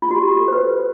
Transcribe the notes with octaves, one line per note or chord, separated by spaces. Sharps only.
F4
F#4
G4
G4
A4
C5
B4